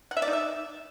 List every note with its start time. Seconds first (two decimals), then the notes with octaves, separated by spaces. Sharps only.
0.11 F#5
0.17 E5
0.22 D5
0.28 D#4
0.33 E5